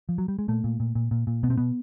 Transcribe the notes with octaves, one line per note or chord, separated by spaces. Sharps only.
F3
F#3
G3
G#3
A#2 A3
A#2
A#2
A#2
A#2
A#2
B2 B3
C4
B2 B3